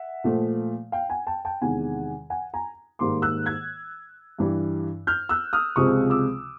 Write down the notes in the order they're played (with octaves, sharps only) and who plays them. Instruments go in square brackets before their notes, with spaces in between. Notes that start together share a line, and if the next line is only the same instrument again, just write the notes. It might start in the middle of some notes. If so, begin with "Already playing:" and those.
Already playing: [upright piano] E5 F#5
A#2 F3 A3
F5 G5
F#5 G#5
G5 A5
G5 A5
E2 C3 D#3 G#3 F#5 G#5
F#5 G#5
G#5 A#5
G#2 D#3 G3 A#3 C6 D6
E6 F#6
F#6 G#6
G2 E3 G3
F6 G6
E6 F#6
D#6 F6
C#2 C3 F3 G#3 C4 C#6 D#6
D6 E6